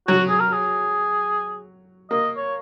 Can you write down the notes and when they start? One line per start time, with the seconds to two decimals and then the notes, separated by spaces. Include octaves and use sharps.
0.08 F#3 F#4
0.29 G#4
0.40 A#4
0.53 G#4
2.11 A#3 D#5
2.37 C#5